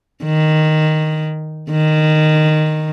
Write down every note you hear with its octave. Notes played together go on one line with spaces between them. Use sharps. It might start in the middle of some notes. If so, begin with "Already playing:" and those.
D#3
D#3